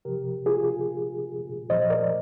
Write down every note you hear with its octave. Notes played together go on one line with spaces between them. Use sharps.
C3 F3 G4 A#4
F4 G#4
A#2 F3 C5 D#5
A#4 D5